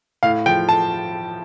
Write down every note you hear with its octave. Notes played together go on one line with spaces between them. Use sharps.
A2 F5
F3 G5
A5